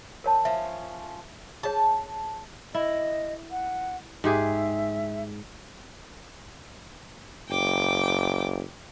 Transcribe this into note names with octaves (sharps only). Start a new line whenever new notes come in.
A#4 C#5 A5
F3 C#4 E5
G#4 C#5 A5
E4 D#5
F#5
G#2 G4 G#4 E5
F#1 G5 D6